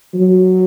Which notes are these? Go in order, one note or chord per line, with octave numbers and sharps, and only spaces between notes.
F#3